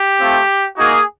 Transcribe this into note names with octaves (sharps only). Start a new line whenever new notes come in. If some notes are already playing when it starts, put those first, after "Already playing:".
Already playing: G4
A3 C4 F4
A#3 D#4 F#4 G#4